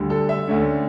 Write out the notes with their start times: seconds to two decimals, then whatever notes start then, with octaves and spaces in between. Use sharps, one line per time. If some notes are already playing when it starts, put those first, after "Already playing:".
Already playing: D2 D3 G3
0.10 A4
0.29 E5
0.48 D2 D3 A3 C#4